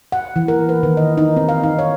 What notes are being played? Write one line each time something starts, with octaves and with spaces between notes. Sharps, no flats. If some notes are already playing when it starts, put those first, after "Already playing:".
F#5
E3
A#4
B4
D#3
D#5
D#4
C4
F5
D#4
C#5